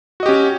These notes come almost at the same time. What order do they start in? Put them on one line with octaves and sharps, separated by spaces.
F#4 D#5 G4 C#4